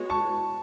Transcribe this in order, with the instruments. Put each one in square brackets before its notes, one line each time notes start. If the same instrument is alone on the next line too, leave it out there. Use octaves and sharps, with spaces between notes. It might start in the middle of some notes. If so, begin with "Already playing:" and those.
Already playing: [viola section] G#3 B3 F#4 C#5
[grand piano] A5 C#6